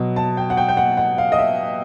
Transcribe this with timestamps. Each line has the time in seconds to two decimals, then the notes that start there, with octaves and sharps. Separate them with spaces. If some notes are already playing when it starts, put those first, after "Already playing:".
Already playing: B2 F#3
0.16 A5
0.37 G5
0.50 F#5
0.57 G5
0.68 G5
0.77 F#5
0.97 F#5
1.18 F5
1.32 D#5
1.39 E5